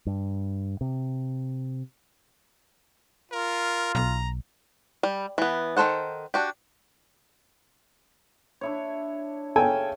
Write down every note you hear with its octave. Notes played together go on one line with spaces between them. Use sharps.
G2
C3
F4 A#4
B1 A#5
G3
E3 B3
D#3 C#4 A4 C5 F#5
D4 F#4 G4
D4 E4 C#5
C#3 C#4 A4 G5 G#5